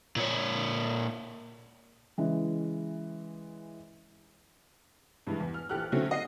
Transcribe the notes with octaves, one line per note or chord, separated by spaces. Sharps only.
A#2 C#5
C#3 E3 G#3
G2 E3 G#3
E2
F6
A#1 E3 G4 A4 F6 F#6
D3 D#3 F#3 A3 C4 C#4
D#5 C7 D#7